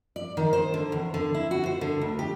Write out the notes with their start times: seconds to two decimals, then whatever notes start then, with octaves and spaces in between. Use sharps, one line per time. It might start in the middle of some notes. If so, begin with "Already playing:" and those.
0.16 D5
0.37 D#3
0.53 C5
0.74 D3
0.92 E2
1.14 D3
1.35 E4
1.51 F#4
1.66 C5
1.81 D3
2.02 D2
2.19 G4